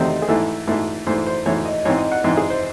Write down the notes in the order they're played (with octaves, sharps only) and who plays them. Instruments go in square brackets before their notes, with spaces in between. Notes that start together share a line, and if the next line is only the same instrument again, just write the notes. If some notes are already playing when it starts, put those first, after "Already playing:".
Already playing: [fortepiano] E2 C3 D#3 A3 C4 C5 D#5
G#4
G#2 E3 A3 A4
G#2 E3 A3
G#2 E3 A3 C5
C5
G#2 E3 A3 C#5
D#5
G#2 E3 C4 C#5
D#5
F#5
G#2 E3 C4 E5
G#4
C5